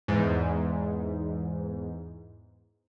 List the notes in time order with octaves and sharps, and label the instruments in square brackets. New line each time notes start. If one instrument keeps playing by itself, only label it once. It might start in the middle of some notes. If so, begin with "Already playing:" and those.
[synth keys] E2 G#2